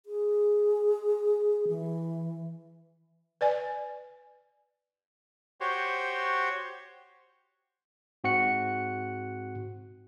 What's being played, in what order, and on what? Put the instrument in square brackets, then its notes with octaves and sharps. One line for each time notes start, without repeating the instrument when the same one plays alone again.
[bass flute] G#4
E3
[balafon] B4 D5 G#5
[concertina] F#4 G4 C5 C#5
[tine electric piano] G#2 C4 F#4 F#5 F#6 C#7